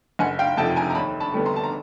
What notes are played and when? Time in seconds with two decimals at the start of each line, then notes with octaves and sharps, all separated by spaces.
0.19 F#1 F#5 G#5
0.39 F5 G5
0.57 F2 C3 F3 G5 A5
0.76 G#5 A#5
0.90 A#5
0.95 D#2 A5 B5
1.20 A5 B5
1.33 D3 G3 B3
1.46 A#5 C6
1.56 A5
1.64 A#5